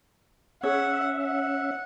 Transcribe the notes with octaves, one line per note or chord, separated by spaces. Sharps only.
C#4 G#4 C#5 E5 F#5
F#5